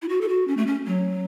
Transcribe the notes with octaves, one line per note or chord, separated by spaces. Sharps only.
E4
F#4
A4
F#4
C#4
A3
C#4
F#3